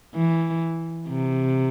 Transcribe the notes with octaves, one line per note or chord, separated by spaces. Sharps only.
E3
C3